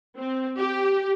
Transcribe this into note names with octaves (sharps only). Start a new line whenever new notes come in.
C4
G4